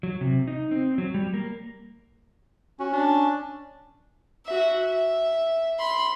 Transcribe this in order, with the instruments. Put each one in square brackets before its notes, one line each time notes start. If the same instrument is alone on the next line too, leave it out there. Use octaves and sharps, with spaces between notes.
[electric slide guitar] F#3
C3
D#4
C4
F#3
G3
A#3
[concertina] C#4 [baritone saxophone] F#4
[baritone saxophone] D4
[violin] F#4 E5
E5
B5 C6